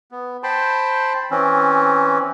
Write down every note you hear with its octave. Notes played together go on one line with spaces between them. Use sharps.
B3
C5 G5 A5 B5 C6
E3 C4 C#4